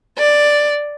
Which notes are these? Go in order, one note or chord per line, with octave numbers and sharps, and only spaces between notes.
D5